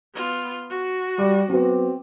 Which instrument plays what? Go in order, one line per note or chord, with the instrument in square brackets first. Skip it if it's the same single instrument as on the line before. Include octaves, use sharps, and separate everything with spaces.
[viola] B3 F4
F#4
[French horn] G3 [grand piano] D6
[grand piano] F#3 B3 [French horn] C4